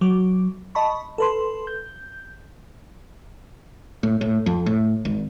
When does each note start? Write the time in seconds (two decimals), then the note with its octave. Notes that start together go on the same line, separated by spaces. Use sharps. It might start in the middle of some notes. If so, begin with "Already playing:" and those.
0.01 F#3 D6
0.75 D#5 A5 B5 C#6
1.18 A4 B4 C6
1.67 G6
4.03 A2
4.21 A2
4.46 F2
4.66 A2
5.05 G#1